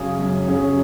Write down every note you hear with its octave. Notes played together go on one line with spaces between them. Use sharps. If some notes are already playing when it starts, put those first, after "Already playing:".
Already playing: F#2 C#3 F#3 C#4 G#4
F#2
C#3 F#3 C#4 G#4